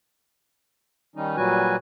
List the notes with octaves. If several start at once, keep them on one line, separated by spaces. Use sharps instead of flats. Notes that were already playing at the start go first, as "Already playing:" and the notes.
D#3 G3 C#4 D#4
A#2 F#3 G3 F#4 B4 G#5